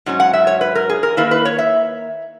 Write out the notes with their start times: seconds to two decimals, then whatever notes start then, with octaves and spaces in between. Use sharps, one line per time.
0.06 G#2 F#3 C#4
0.20 F#5
0.33 E5
0.47 C#5
0.61 B4
0.75 A#4
0.90 G#4
1.03 A#4
1.17 D#3 A#3 E4 B4
1.31 B4
1.45 C#5
1.58 E5